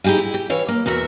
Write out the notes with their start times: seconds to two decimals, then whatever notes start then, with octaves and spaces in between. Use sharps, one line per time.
0.04 D#4 E4 G4 G#4 F5
0.18 E4
0.34 G4
0.50 E3 C#5 F5
0.68 A#3
0.86 E2 F#4 A#4 E5